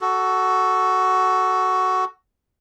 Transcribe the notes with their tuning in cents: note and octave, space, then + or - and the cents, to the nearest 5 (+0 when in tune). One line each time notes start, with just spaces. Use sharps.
F#4 +10 A4 +0